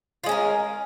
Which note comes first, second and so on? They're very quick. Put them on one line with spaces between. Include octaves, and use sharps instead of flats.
F4 G#3 C#4 A#4